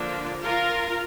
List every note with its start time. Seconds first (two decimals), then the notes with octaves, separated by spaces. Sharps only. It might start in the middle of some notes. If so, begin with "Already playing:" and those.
Already playing: D3 F3 A#3 D4
0.43 F4 A#4